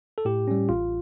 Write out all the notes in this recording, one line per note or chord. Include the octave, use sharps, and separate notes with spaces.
A4
A2 G4
G3 C#4
A1 F4